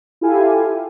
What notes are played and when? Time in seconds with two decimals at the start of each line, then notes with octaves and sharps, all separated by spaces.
0.21 E4 F4 G4 A4 F5 G#5